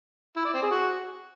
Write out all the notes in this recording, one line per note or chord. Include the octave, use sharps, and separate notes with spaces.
E4
D5
C4
G#4
F#4